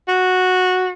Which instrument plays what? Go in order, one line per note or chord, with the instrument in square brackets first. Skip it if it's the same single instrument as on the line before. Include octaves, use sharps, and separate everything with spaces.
[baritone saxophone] F#4